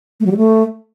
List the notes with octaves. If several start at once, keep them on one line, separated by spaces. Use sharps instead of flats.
A3
F#3
G3
A3